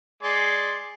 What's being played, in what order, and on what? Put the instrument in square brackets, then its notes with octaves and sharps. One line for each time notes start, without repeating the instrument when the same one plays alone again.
[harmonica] G#3 D5 C6